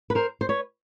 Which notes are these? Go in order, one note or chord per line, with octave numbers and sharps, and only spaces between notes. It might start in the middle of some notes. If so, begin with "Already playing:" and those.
B4
A#4 C5
C5
B4 C#5